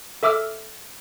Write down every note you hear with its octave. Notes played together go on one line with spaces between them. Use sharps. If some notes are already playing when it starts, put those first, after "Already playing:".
A4 E5 D6 E6 F6